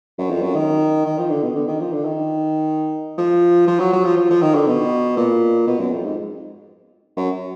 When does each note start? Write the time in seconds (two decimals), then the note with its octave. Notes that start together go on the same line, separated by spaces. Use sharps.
0.18 F#2
0.30 F2
0.42 F#2
0.55 D#3
1.06 D#3
1.18 F3
1.30 D3
1.43 B2
1.55 D3
1.68 D#3
1.81 F3
1.92 D3
2.05 D#3
3.18 F3
3.68 F3
3.80 F#3
3.93 F#3
4.05 F3
4.17 F3
4.30 F3
4.42 D#3
4.55 D3
4.67 B2
5.17 A#2
5.67 B2
5.80 F#2
5.92 F2
6.04 G#2
7.17 F#2